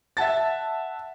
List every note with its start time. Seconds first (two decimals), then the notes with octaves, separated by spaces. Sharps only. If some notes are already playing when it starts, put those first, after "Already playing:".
0.17 E5 F#5 A5 A6